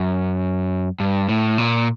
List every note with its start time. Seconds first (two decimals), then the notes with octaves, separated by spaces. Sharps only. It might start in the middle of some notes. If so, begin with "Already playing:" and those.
Already playing: F#2
1.00 G2
1.29 A2
1.58 A#2